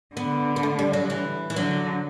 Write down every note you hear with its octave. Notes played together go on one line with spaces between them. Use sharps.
D3 B3
B3
A3
G3
F#3
E3
E3
D3 F#3